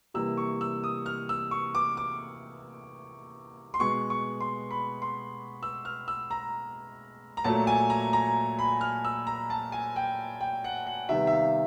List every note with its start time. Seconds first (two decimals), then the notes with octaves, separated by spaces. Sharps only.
0.14 C3 E3 G3 A#3 E6
0.37 C#6
0.61 E6
0.84 D#6
1.06 F6
1.29 E6
1.51 C#6
1.75 D6
1.97 D6
3.74 C6
3.79 B2 G#3 B3 C#6
4.10 C#6
4.40 C6
4.71 B5
5.02 C6
5.63 E6
5.85 F6
6.08 E6
6.31 A#5
7.37 A#5
7.44 A#2 F#3 A3 A5
7.67 G#5
7.90 A#5
8.13 A#5
8.59 B5
8.81 F6
9.05 E6
9.27 A#5
9.50 A5
9.72 G#5
9.96 G5
10.41 G5
10.64 F#5
10.87 F#5
11.09 C3 D#3 G3 B3 E5
11.27 E5
11.33 F5